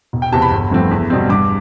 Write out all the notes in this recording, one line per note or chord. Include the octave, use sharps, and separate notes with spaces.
E1
G5
E2 C3 A5
B5
G1
G2 F3 A3 C4
E2
B2 G3 C4
G2 D6